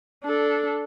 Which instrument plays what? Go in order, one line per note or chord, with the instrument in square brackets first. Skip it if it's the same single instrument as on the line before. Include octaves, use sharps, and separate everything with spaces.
[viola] D4 A4